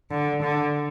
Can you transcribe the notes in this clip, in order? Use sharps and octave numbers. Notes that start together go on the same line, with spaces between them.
D3
D3